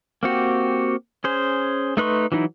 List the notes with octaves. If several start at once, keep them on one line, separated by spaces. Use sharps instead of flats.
A#3 C4 F#4 G4
C#4 G#4 C5
A3 D#4 B4 C6 C#6
E3 F#3 D#4 E4